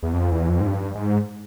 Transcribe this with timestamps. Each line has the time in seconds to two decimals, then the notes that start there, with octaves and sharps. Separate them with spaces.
0.03 E2
0.13 F2
0.31 E2
0.49 F2
0.61 G#2
0.67 G2
0.95 G#2